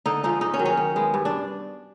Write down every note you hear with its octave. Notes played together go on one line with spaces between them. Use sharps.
D3 D#4
F3 G#3 D#4
G#2 D#4
C#4
D#3 F#3
C#4
D#3
G#3 B3
G2
D4